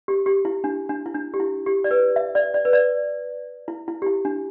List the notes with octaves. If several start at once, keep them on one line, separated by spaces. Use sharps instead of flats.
G4
G4
E4
D4
D4
E4
D4
G4
E4
G4
D5
B4
E5
D5
D5
B4
D5
E4
E4
G4
E4
D4